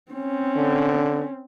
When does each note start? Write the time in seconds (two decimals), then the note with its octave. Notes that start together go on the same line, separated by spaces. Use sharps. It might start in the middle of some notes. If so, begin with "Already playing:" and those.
0.12 C4 C#4
0.56 D3